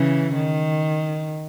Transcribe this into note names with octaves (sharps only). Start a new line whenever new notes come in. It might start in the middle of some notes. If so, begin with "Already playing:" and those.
Already playing: C#3 E3
D#3